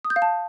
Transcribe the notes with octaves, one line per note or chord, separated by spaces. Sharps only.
D#6
G6
F5
A5